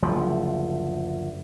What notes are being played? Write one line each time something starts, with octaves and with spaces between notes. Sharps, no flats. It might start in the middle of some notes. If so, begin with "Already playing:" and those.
F#1 D2 F3